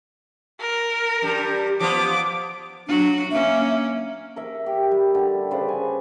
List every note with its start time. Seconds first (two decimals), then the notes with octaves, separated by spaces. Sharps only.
0.61 A#4
1.22 G2 G3
1.80 F3 B3 D6
2.88 F#3 D4 F#4
3.32 A#3 C#4 E5
4.36 A#4 E5
4.66 G4
4.91 G3
5.15 D3 G3
5.51 C#3 B4 C5 D5
5.69 G#5